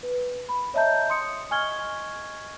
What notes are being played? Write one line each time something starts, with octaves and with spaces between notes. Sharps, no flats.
B4
B5
C#5 D#5 E5 A5 A#5 G6
C6 D#6 C#7
D#5 G#5 C#6 F6 G#6 G7